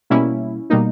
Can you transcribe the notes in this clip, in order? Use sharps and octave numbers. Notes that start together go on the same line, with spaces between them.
B2 G3 A#3 C#4 E4
B2 G3 A#3 D#4